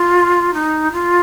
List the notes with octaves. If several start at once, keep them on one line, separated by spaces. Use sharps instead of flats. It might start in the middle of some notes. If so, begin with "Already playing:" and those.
Already playing: F4
D#4
F4